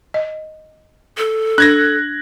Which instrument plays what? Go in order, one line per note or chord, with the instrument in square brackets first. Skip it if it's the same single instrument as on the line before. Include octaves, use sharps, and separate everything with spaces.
[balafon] D#5
[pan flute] A4
[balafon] D4 [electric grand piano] F#6 G#6 A#6